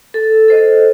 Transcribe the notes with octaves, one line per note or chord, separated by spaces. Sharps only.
A4
A4 C5 D#5